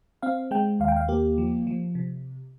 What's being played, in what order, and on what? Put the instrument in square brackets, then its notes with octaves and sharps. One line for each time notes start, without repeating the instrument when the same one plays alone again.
[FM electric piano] C4 F5
G#3 G5
D#2 F5
G5
F5
A#3 G4
F3
F3
C3